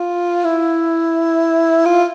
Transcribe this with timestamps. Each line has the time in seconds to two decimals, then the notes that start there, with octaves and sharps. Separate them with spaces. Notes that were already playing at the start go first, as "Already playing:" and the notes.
Already playing: F4
0.45 E4
1.86 F4